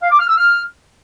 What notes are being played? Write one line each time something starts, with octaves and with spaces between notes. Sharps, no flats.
F5
D6
F6
E6
F6